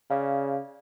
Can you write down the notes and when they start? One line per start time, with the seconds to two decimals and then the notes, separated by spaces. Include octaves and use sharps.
0.10 C#3 D5 F5